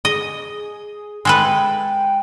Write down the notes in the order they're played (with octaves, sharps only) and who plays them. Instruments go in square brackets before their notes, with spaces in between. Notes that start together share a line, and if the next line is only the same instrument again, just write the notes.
[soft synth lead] G#4 [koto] D#5
[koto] G#3 A4 B4 [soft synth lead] G5